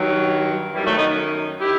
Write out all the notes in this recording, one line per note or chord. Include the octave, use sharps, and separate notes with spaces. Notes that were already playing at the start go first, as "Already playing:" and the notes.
Already playing: G2 D#3 F#3
F#2 D#3 E3 G3
F#3 A3
B3 D#4
D#3 E4 G4